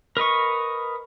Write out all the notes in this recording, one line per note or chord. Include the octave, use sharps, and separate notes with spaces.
A#4 B4 D#5 C#6